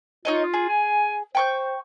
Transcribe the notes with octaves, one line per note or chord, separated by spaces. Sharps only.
D#4 F4 C#5 D#5
G#4
G#5
C5 G5 C#6 G6